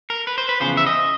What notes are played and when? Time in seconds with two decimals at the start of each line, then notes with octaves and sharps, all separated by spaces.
0.10 A#4
0.27 B4
0.38 C5
0.49 B4
0.60 E2 C#3 F3 C5
0.77 E5
0.86 D#5